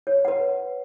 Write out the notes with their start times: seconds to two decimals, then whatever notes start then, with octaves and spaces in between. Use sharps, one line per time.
0.07 C#5
0.25 B4 F#5